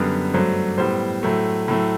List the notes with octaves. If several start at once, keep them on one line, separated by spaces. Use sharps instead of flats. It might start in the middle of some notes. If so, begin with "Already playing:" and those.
Already playing: F#2 D3 G3 B3
G2 F#3 A3 C5
A2 G3 B3 C5
A2 F#3 A3
A2 F#3 A3